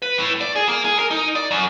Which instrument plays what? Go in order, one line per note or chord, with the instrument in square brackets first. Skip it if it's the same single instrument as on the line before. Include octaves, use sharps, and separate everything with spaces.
[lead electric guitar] B4
A2
D5
G#4
A#3
G#4
A#4
D#4
D5
F#2